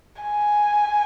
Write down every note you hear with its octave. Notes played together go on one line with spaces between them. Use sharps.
G#5